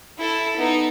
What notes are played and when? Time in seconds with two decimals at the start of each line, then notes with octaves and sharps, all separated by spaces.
0.18 E4 A4
0.56 B3 D#4